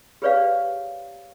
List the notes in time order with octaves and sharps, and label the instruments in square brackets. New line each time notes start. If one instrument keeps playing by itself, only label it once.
[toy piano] G4 G#4 B4 C#5 D5 F5